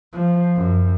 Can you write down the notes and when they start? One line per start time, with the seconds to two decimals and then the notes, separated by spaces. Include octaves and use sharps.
0.13 F3
0.56 F#2